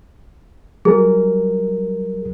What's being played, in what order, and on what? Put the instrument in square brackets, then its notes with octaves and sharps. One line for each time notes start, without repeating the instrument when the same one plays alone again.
[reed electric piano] F#3 G3 A#4 [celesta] G#4